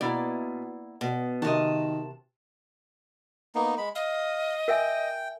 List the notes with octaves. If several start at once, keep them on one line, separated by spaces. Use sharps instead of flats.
B2 A#3 E4 D5
B2
C3 D#3 F#4 A#4 D#5 A5
A#3 B3 D#4
G#3 B5
D#5 F5
A#4 E5 G5 G#5